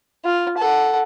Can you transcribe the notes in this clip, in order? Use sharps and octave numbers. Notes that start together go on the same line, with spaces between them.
F4
A4 F#5